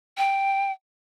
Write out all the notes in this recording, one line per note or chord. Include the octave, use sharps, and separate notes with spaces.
G5